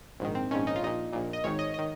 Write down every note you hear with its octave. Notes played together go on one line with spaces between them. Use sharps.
A#1 G#2 D#3
C4
A#1 G#2 D#3 C#4
D#4
F4
A#1 A#2 D#4
A#1 A#2
D#5
G#1 G#2 D#3 C#5
D#5
D#5
D#3